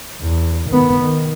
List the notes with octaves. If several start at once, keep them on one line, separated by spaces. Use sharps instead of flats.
E2
D#3 B3
D#3